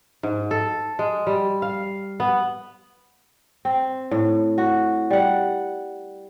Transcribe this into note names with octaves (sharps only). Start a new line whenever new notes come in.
G#2
A4
G#3
G3
F5
B3
C4
A2
F#4
G3 F#5